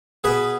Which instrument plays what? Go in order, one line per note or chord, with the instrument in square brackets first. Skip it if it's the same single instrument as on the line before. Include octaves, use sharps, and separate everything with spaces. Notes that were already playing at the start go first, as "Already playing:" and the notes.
[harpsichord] B2 G#4 B4